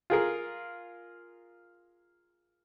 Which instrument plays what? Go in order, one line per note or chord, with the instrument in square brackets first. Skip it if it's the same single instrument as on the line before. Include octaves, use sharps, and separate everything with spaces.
[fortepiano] F4 G#4 A#4